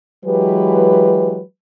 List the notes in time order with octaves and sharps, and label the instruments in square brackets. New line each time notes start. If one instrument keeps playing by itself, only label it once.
[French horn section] E3 F#3 G#3 G4 B4